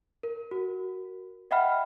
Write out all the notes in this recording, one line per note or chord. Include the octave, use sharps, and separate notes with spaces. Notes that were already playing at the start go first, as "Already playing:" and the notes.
A#4
F#4 A#4
D#5 E5 F#5 G5 B5 F6